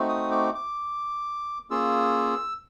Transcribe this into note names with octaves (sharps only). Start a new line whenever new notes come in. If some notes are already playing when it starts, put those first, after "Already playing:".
Already playing: A3 C4 D#4 F#4
D#6
D6
D6
A#3 C#4 F4 G#4 E6